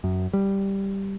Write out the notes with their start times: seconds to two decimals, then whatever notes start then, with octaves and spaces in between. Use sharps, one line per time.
0.04 F#2
0.33 G3